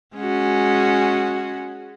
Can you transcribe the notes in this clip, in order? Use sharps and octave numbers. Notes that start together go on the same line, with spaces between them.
G#3 C#4 F#4